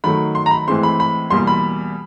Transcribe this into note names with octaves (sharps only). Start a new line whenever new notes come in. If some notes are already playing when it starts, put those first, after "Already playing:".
D#3 F#3 A3 B5
C6
A#5
B5
A2 E3 G#3 C4 C6
B5
B5
E2 B2 G3 A#3 C6
B5